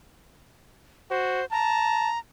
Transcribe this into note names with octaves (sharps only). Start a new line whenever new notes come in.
F#4 C5
A5 A#5